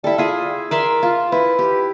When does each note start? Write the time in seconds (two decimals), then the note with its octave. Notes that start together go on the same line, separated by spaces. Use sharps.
0.04 G3 E4 A4
0.18 E4 F4 G#4
0.71 A#4 D5 E5 C6
1.03 F4
1.32 E4 B4
1.59 G4